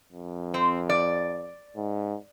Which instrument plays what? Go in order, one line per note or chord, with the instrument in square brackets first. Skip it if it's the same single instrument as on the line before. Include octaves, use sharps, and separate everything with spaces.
[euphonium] F2
[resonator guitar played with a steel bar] C4
D5
[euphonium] G#2